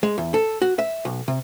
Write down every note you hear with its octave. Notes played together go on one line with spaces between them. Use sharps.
G#3
E2
A4
F#4
E5
B1
C3